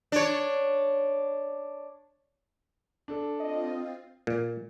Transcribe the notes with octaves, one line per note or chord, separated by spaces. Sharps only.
D4 C#5
D4 A4
C4 F4 D#5
A#2